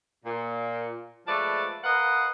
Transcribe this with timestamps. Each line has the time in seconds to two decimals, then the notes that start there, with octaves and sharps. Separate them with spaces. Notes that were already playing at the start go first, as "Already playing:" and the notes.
0.25 A#2
1.27 F3 G#3 A3 B4 D5 A5
1.84 A#4 B4 D#5 F5 F#5